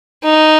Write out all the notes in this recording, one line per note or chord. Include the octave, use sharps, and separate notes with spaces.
D#4